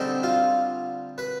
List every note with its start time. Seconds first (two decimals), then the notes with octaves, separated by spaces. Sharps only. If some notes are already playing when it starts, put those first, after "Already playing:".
Already playing: D3 G3 C4 D#4
0.23 F4
1.18 B4